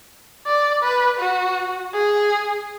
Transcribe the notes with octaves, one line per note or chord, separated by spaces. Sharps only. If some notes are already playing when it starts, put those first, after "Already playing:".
D5
B4
F#4
G#4